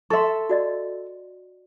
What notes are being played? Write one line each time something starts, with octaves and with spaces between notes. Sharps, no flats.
A4 E5 C6 C#6
F#4 D5 D#5